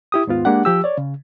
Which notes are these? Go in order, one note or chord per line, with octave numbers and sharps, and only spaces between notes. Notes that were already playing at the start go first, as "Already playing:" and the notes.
E4 G4 D#6
D#2 G#2 B3 F4
G#3 A#3 D4 G4 F#5
F3 G4 E6
C#5 D5
C#3